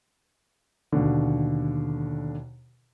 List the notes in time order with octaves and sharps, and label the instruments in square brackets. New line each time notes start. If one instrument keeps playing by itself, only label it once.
[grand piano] D#2 B2 D3